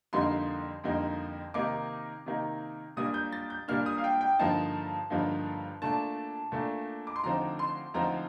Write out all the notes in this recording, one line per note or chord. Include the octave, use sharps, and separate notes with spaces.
F2 D3 G3 A#3 D#4 C6
F2 D3 G3 A#3 D#4
C3 D#3 A#3 D#4 D6
C3 D#3 A#3 D#4
A#2 G3 A#3 D4 D#6
G6
A6
G6
A#2 G3 A#3 D4 F6
D#6
F5
G5
G5
G2 D3 F3 A#3 D#4 A5
G2 D3 F3 A#3 D#4
A#2 A3 D4 A5
A#2 A3 D4
D6
C6
D2 D3 F3 C4 D#4 A#5
C6
D2 D3 F3 C4 D#4 A#5